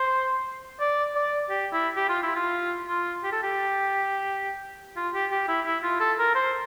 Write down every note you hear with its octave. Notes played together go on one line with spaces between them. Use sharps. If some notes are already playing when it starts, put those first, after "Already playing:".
Already playing: C5
D5
D5
G4
E4
G4
F4
E4
F4
F4
G4
A4
G4
F4
G4
G4
E4
E4
F4
A4
A#4
C5